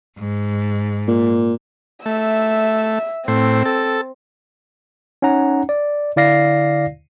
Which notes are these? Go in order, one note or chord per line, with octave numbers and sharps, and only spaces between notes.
G#2
A#2
A3 E5
A2 C4 C5
A4
C#4 D#4 F#5 A#5
D5
D3 E4 D5 F5 A#6 C7